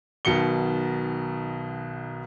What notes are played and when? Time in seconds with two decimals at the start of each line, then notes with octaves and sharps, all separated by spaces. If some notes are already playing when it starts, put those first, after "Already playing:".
0.25 B1 B2 D#3 C#7 G7